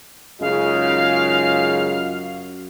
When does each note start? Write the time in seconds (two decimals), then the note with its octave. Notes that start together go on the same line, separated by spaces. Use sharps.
0.41 F#2 C#3 G#3 D#4 F4 F5